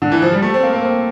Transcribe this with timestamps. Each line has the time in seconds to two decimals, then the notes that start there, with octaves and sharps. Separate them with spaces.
0.02 D3
0.12 E3
0.22 F3
0.32 G3
0.42 A3
0.54 C4
0.63 A#3
0.73 A#3
0.84 C4